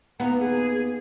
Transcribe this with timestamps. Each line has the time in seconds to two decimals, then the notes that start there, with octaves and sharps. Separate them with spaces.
0.20 D#2 B3 A#5
0.40 G#4